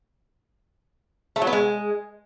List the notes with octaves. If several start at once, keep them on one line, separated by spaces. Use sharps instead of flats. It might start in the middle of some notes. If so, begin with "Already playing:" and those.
A3
F#3
B3
G#3